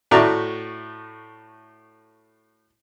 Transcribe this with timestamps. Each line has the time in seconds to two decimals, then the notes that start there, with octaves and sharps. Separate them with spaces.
0.11 A2 A3 F#4 D5 E5 A#5